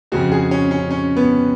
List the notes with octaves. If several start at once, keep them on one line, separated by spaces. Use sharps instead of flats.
F2 C#3 F3 G#3 F#4
G#4
C#4
C#4
C#4
B3